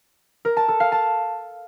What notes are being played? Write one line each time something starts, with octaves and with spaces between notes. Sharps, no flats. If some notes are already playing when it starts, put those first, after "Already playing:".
A#4
A5
A4
F5
A5